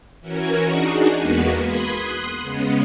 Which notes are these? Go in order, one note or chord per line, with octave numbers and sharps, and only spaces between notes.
E3 C#4 F#4 A#4 G#6
D4 D#4 F#4 G#4
E2 G#3 A#3 B3 F#4 B4
B5 C6 D#6 G#6
C6 D#6 F#6
C#3 G#3 B3 C#4